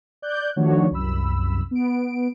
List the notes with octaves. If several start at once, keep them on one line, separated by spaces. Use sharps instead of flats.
D5 F#6 G6
D#3 F3 A3 D4 F#4 C#5
C2 F#2 B5 E6
B3 D7